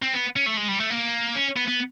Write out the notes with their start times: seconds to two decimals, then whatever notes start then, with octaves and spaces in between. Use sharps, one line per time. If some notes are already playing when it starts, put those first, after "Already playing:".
0.02 C4
0.13 B3
0.36 C#4
0.46 A3
0.57 G#3
0.68 G3
0.80 A3
0.90 A#3
1.35 C#4
1.57 B3
1.68 B3